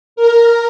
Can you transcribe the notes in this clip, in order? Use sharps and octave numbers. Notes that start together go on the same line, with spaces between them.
A#4